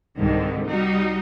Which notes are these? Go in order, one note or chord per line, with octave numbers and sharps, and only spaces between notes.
C2 G#2 D3 D#3
G3 D#4 F#4